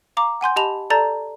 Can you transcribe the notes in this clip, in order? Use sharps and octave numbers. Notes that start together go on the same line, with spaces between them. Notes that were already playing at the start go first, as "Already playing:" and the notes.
F5 A#5 D6
F#5 G#5 C6 G6
G4 D#5 A5 B5 F7
A4 D5 A5 A#5 G6 A6